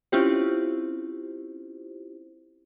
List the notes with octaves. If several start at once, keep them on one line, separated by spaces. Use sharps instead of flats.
C4 C#4 E4 F4 G4 C5